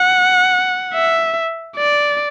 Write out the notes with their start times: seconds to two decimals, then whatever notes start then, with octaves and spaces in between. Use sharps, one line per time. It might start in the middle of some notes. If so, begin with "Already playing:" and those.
Already playing: F#5
0.93 E5
1.77 D5